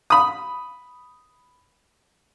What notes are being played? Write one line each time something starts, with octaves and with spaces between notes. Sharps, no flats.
B5 D#6